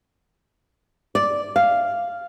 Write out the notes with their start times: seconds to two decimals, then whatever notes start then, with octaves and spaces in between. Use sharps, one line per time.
1.15 D5
1.56 F5